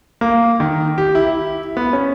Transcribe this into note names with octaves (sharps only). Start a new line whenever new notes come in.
A#3
D#3
G4
E4
B3
C#4